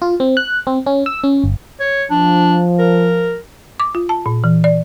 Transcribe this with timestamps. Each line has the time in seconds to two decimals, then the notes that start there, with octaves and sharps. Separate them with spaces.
0.02 F4
0.20 C4
0.37 F#6
0.67 C4
0.86 C#4
1.06 E6
1.24 C#4
1.44 G1
1.80 C#5
2.10 F3 D4
2.79 A#4
3.80 D6
3.95 F4
4.09 A5
4.26 A#2
4.44 E3
4.64 D5